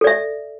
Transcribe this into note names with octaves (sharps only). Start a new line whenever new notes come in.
A4 D5 E5